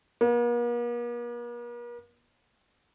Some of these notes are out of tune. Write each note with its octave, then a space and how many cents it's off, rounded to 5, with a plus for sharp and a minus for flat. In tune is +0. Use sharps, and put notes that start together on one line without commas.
A#3 +45